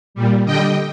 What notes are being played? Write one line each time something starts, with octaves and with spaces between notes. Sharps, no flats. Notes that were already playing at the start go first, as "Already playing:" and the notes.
A#2 G3
D3 G3 D#5 G5